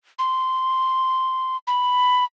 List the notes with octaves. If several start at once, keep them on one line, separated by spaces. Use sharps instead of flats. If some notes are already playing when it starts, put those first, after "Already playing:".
C6
B5